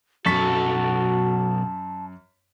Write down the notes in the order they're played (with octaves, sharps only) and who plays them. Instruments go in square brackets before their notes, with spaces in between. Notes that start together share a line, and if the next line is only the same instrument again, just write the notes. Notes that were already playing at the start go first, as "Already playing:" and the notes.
[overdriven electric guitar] B1 A4 [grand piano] F#2 C#6 B6 [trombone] F#4 [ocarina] A5